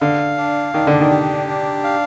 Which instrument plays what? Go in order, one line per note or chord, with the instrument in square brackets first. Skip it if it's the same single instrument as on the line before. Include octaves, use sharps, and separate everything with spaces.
[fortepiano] D3 [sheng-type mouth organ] F5
[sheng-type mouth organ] D4
[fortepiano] D#3 [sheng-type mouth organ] D4
[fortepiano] D3
D#3
[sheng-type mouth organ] G4
D4
F5